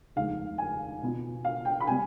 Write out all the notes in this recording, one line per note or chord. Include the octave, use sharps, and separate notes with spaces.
F1 D#2 D#3 G#3 F5
G#5
B2 B3 F4
F5
G5
B5
C3 G3 B3 G#5